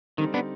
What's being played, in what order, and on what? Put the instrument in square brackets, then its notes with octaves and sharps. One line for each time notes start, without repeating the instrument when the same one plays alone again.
[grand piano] D3 G3 C4 D#4 [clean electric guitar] D#3
[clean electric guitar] B3 D4